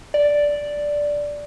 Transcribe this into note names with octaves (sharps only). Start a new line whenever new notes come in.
D5